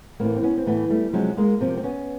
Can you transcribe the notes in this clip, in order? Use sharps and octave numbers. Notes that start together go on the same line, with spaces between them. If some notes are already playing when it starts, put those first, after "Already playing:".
A2 E3 A#3 C4
C4
B3 C#4
C4
A2 E3 A3 B3
G3 A3
C3 F3 F#3 G#3
G#3 A#3
C3 F3 A#3 C4
C4
B3 C#4